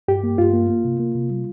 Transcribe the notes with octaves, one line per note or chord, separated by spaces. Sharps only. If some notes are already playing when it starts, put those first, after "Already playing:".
G2 G4
A#3
G2 F4
A#3
A#3
C3
A#3
C3
G3